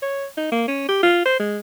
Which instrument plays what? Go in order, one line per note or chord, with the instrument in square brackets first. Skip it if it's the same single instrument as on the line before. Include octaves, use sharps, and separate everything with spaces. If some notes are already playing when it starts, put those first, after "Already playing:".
[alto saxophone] C#5
D#4
A#3
C#4
G4
F4
C5
G#3